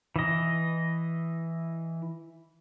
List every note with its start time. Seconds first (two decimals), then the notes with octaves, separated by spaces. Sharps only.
0.16 E3 D#5